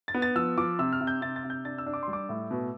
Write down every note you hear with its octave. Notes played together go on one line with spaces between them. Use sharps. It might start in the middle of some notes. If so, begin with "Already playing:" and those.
A6
B3
A6
F3 E6
F3 D6
C3 E6
F6
C3
G6
C3 A6
A6
C3
G6
D4 A6
E6
D4
D6
C6
G3
D6
A2
B2